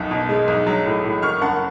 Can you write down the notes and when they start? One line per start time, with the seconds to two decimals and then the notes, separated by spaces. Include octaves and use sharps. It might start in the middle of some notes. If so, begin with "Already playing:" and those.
Already playing: B1 F#2 B2
0.11 B2
0.29 G#3
0.48 B1
0.67 F#3
0.85 A2
1.04 A2
1.22 F#1 C#6 F6
1.41 F#2 F#5 A5